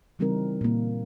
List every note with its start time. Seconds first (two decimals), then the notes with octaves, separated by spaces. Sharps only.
0.19 C#3 E3 G3 C4 D#4 A#4
0.61 A#2 A#3